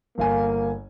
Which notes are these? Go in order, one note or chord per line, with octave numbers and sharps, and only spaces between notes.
G1 A#3 F5 G#5